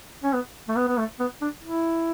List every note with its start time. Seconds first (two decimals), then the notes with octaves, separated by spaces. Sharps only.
0.24 C#4
0.33 B3
0.69 A3
0.76 B3
0.88 B3
0.98 A3
1.20 B3
1.41 D4
1.63 E4